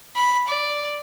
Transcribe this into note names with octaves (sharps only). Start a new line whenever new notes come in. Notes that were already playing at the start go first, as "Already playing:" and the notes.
B5
D5